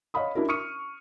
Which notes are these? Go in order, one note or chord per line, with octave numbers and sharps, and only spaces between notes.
C#5 D#5 F5 F#5 B5 D#6
D4 E4 F#4 A#4
C#6 D#6 F6 C#7 D#7